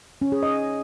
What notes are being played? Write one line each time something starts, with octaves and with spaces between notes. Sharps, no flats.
C#4
G#4
D#5